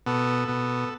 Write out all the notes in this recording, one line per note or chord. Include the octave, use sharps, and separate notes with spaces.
B2 B3 A4
B2 B3